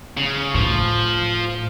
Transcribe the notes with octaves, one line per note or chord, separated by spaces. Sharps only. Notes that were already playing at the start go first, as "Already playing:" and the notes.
C#3
A2 F3